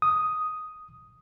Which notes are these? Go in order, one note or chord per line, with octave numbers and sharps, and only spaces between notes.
D#6